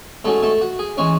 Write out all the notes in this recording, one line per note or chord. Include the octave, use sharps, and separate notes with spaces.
G#2 F#3 A3 C#4 A4
A3 A4
F#4
G#4
E3 G#3 C#4 C#5